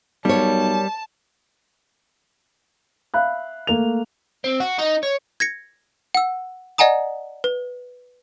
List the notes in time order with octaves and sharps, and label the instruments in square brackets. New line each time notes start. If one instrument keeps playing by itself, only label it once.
[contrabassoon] B1 [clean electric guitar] G3 [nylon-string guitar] A#4 C#5 [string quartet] A5
[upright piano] E5 F5 B5 F#6
A3 A#3 F7
[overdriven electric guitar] C4
F#4
D#4
C#5
[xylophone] G#6 A#6 C#7
F#5 E6
D5 D#5 F#5 G#5 A#5 D#6
B4